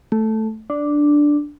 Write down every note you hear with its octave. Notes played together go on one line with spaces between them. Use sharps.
A3
D4